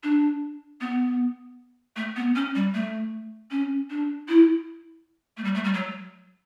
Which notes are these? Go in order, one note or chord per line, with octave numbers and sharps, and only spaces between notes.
D4
B3
A3
B3
C#4
G3
A3
C#4
D4
E4
A3
G3
A3
G3
F#3